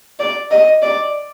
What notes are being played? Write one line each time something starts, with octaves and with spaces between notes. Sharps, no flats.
D5
D#5
D5